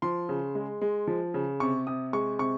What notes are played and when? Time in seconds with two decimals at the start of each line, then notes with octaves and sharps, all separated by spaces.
0.02 F3 C6
0.29 C#3
0.55 G#3
0.81 G#3
1.07 F3
1.34 C#3
1.60 C3 C#6
1.87 C3 D#6
2.13 G#3 C#6
2.39 C3 C#6